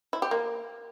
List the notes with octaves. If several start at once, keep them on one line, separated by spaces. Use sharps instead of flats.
E4
G4
A#3